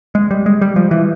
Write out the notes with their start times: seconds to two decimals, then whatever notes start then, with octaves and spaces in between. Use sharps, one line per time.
0.15 G#3
0.31 G3
0.46 G#3
0.61 G3
0.76 F3
0.91 E3